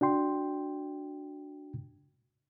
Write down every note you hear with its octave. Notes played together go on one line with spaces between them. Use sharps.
D4 F#4 G5 C6